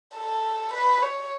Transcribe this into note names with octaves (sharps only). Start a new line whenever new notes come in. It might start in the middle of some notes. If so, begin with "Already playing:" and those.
A4
B4
C#5